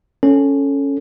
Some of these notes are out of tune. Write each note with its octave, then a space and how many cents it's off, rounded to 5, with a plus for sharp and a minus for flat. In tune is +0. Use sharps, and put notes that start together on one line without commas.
C#4 +0 A4 +0